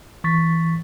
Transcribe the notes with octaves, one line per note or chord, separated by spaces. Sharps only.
E3 C#6 A6 B6